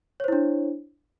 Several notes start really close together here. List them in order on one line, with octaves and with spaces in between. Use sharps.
C#5 C5 E4 D4